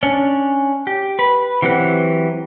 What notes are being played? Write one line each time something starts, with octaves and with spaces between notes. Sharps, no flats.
C#4 D4
G4
B4 B5
E3 F#3 C4 G4 F#5